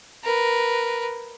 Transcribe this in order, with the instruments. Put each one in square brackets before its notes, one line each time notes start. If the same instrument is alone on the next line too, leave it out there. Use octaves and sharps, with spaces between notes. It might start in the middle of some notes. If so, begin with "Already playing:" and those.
[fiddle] A#4 B4